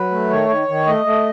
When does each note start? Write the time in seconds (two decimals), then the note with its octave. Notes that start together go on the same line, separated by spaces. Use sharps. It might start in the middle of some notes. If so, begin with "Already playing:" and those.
Already playing: F#3 B4
0.11 A3
0.29 D#3 C#5
0.49 D#3
0.68 D#3
0.87 A3 D#5
1.05 A3